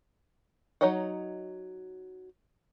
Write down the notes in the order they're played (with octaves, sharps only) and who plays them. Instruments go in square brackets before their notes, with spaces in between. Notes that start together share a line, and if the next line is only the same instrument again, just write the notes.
[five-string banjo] F#3 D#4 C#5 D#5 F#5